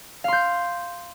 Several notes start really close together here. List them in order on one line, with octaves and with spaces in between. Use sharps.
F5 C6 G6